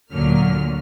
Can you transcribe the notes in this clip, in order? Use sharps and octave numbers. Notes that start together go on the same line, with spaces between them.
D2 A#2 D3 F#3 A#3 F6